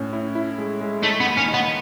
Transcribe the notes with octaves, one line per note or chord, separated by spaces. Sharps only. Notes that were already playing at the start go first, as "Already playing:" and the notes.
Already playing: A2 C#4
E4
E4
G#3
G#3
A3 D#4
B3
D#2
C#4
D#4
B3